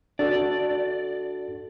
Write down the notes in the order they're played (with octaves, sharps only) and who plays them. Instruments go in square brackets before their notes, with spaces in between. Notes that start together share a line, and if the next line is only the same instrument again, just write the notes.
[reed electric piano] D4 F#4 A4 [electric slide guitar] D5